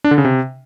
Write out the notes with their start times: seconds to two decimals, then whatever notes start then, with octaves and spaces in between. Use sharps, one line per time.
0.04 D4
0.11 D3
0.18 C#3
0.25 C3